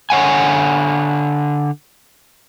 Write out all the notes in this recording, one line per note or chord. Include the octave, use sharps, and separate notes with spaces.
D3 C#5 F#5 G#5